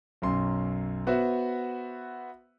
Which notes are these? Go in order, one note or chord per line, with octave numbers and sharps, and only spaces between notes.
B1 F#2 C6
B3 F#4 B4 C5 E5 F#5